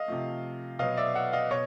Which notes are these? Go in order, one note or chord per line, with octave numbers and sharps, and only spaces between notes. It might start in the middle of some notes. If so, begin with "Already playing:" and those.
Already playing: D#5 F5
C3 F3 A3
B2 F#3 B3 D#5 F5
D5 E5
E5 F#5
D#5 F5
B2 C#5 D#5